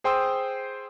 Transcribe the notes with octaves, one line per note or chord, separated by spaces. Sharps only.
G#4 C5 G5 C6 D#6 E6